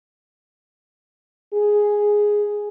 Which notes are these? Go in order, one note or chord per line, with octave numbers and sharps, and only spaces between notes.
G#4